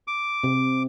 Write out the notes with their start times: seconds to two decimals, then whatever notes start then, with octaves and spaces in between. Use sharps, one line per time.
0.08 D6
0.44 C3